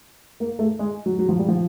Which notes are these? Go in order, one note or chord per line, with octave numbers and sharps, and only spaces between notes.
A#3
A3
G#3
F#3
F#3
F3
G3
F3